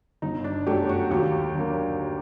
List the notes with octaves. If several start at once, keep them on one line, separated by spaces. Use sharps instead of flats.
G1 D#4
D4
F#2 F#3 A3 G4
F#4
D#2 G4
D3 F#3 A#3